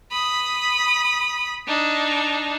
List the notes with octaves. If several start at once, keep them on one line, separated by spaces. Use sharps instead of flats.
B5 D#6
D4 D#4